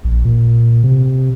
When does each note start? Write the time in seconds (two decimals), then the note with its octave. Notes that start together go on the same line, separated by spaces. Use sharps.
0.04 A#1
0.25 A#2
0.84 C3